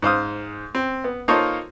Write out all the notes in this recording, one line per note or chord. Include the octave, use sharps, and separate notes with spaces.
G#2 C5 F5 D#6
C4
B3
A#3 D#4 F4 A4 C5 C#5